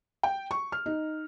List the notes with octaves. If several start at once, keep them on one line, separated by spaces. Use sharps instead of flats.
G5
C#6
F6
D#4